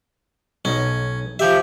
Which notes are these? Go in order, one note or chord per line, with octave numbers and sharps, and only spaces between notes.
B1 C#4 D#4
F3 G4 E5